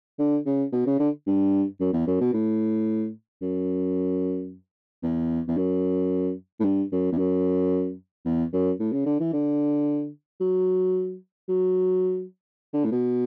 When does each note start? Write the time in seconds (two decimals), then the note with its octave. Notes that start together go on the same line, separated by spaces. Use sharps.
0.19 D3
0.46 C#3
0.72 B2
0.86 C#3
1.00 D3
1.27 G2
1.80 F#2
1.93 E2
2.07 F#2
2.21 B2
2.33 A2
3.42 F#2
5.03 E2
5.48 E2
5.57 F#2
6.60 A2
6.64 G2
6.92 F#2
7.12 E2
7.18 F#2
8.25 E2
8.53 F#2
8.80 A2
8.93 C#3
9.06 D3
9.20 E3
9.33 D3
10.41 F#3
11.49 F#3
12.74 D3
12.85 A2
12.92 B2